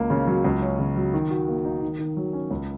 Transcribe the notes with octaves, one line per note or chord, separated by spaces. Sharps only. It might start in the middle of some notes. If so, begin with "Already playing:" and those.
Already playing: C#2 A#3
C#3
F#3
C#2
C#4
C#3
F#3
D#3
F#4
A#3
D#4
D#3
D#3
F#3
C#4
C#2